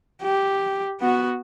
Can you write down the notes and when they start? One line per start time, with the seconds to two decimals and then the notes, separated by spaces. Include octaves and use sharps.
0.22 G4
1.00 B3 F#4